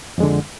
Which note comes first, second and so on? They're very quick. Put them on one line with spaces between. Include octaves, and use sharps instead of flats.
F2 G#3 D3